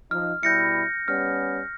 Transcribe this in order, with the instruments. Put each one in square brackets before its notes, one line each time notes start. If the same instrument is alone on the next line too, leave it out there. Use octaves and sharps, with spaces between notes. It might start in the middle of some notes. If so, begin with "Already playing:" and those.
[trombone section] F3 D#4 [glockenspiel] F6
[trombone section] B2 G3 E4 [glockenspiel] G6 A#6 C#7
[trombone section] G3 B3 C#4 [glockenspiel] F6